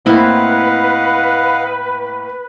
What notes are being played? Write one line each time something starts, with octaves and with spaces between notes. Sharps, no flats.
A2 A#3 C4 E4 B4 D#5 F5 F#5